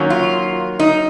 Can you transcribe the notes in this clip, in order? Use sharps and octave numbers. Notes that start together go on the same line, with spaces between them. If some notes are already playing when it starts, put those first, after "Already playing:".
Already playing: D#3 F#3 A#3 C#4
F4
D#4